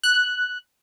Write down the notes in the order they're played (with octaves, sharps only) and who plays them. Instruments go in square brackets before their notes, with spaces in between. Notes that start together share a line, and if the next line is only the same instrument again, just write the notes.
[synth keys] F#6